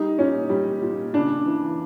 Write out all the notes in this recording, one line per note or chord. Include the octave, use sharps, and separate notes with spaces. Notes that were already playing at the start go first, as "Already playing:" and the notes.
Already playing: G3 D#4
A#2 C#4
G3
A#2
C#3 D4
E3